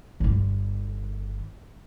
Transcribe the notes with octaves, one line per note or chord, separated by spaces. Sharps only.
G1 D3